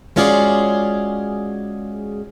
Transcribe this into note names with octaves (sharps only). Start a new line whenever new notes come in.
G#3 C#4 F4 F#4 G#4 D5